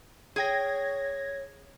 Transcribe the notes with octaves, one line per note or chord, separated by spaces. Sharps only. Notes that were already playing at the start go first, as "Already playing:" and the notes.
G#4 C#5 G5 G#6 A#6